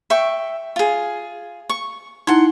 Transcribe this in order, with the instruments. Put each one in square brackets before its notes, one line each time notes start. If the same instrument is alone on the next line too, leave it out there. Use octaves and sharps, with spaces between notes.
[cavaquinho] E5 G5 C#6
F4 G#4
C#6
[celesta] D#4 E4 [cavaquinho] F#5 C6